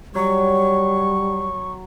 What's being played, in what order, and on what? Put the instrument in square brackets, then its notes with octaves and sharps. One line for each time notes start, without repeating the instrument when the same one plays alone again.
[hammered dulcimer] F#3 [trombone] G3 [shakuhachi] C#6